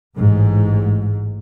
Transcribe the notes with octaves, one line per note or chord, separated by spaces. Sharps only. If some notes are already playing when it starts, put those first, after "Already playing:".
A1 G#2